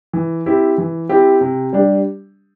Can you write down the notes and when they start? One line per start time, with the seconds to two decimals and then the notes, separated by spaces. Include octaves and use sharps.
0.13 E3
0.46 C4 E4 G4
0.78 E3
1.09 C4 E4 G4
1.41 C3
1.73 G3 D4 G4